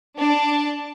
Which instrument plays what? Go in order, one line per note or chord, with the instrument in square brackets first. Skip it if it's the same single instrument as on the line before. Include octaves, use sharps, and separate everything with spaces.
[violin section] D4 A5